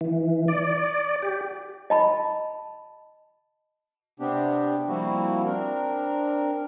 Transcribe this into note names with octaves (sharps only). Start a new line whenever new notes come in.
E3
D5
G4
D#5 A5 B5
C3 B3 C4 D4 G4
F3 G3 A#3 C4 E4 F#4
C4 D4 A#4